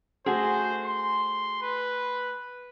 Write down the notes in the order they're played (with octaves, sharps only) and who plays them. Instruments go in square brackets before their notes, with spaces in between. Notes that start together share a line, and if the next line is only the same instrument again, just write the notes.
[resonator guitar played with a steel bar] A3 F#4 G#4 [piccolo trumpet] C5
[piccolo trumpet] C6
B4